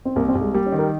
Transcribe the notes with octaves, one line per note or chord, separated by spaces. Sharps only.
C4
C2 A#3
C4
C2
G#3
G3 A#3
C#4
D#3
A#4